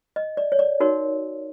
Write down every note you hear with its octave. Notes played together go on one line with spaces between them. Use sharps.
D#5
D5
C#5
D5
D#4 F#4 A#4 C#5